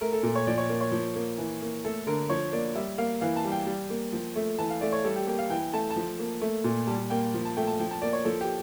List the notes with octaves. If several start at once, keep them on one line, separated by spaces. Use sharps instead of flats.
A3 A#4
A4
A#2 A#4
C#5
F3 D5
C#5
A#3
C#5
F3
A#3
E3
A#3
A3 A4
D3 A#4
F3 C#5
A#3 D5
G3 E5
A#3 F5
E3 F5
A5
G3
G5
G3
A#3
F3
A3
E3 A5
F5
A3 D5
C#5
G3 A4
G4
A#3 G4
F5
E3 G5
A3 A5
A5
F3
A#3
A3
A#2
G3 A5
A#3 G5
F3
A5
A3 G5
A5
F3 G5
A5
A#3 D5
C#5
F3 A4
G4